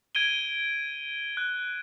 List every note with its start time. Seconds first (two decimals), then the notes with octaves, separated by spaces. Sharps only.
0.15 G#6 D7 D#7 G7
1.37 F#6